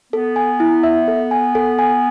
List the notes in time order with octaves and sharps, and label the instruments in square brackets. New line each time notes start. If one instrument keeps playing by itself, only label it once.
[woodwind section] B3 [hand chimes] A4
[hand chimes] G#5
E4
E5
A4
G#5
A4
G#5